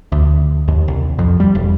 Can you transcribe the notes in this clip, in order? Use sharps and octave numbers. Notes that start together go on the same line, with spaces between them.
D2
D#2
C2
F2
G3
E1